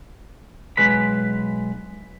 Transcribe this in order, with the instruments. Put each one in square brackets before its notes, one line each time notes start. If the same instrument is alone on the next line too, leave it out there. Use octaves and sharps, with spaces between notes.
[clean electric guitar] B1 G#3 B4 B5